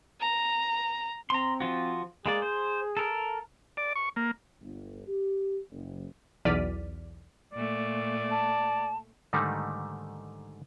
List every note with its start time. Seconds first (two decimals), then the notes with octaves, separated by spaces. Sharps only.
0.20 A#5
1.30 C4 A#5 C6
1.60 F3 F4 F#4
2.26 G#3 A#3 G#4 D5
2.42 C5
2.97 A4 A#4
3.77 D5
3.96 C#6
4.16 A#3
4.61 G1
5.07 G4
5.71 F#1
6.45 B1 E2 D5 F6 B6 D#7
7.53 A#2 A3 D5
8.31 A5
9.33 G#2 D3 D#3 G3 A3 D#4